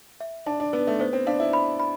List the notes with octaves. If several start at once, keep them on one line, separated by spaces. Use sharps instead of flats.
E5
D4 A5
D4
B3 B4
A3
B3 C5
C4
D4 F5
E4
B5
B5